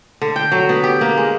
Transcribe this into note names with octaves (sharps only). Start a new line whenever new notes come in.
D3
G5
F#3
B3
G4
A#3
G#3